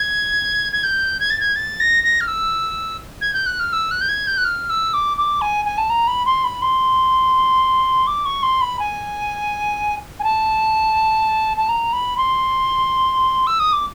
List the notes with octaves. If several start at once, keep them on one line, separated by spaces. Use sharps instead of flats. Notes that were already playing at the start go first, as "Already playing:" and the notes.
Already playing: G#6
G#6
G6
G#6
A6
G#6
A6
A#6
A#6
F6
E6
G#6
G6
F#6
F6
E6
F#6
G6
G#6
G6
F#6
F6
E6
D6
D6
G#5
G#5
A5
A#5
B5
C6
B5
C6
D6
C#6
C6
B5
G#5
G#5
A5
A5
A#5
B5
C6
E6
D#6
D6